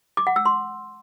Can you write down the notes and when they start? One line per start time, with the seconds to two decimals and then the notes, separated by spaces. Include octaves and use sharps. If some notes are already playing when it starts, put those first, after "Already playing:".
0.17 D6
0.27 F#5
0.36 E6
0.45 C6